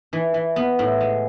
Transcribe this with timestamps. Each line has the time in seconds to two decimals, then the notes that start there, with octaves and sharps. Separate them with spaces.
0.13 E3
0.34 E3
0.56 B3
0.79 A2
1.00 G#3